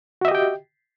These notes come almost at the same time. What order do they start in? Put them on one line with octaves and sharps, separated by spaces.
F#4 E5 D#5 G4 G5